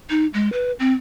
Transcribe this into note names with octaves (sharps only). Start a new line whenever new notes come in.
D#4
G#3
B4
C4